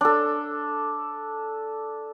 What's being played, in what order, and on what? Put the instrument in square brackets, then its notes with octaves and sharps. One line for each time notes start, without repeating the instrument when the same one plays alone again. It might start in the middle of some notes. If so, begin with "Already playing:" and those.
[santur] D4 A4